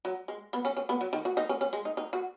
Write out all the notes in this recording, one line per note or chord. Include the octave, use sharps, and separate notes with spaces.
F#3
G#3
B3
C#4
C#4
B3
F#3
D#3
F#4
D#4
C#4
C#4
G#3
D#4
D#4
F#4